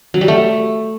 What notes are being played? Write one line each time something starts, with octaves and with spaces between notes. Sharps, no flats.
F#3
G3
A3